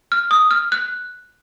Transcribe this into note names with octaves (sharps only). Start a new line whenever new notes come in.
F6
D#6
F6
F#6